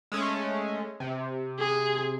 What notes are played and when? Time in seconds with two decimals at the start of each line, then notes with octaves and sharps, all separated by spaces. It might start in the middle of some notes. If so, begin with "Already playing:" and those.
0.12 G#3 A3 C#4
1.00 C3
1.59 G#4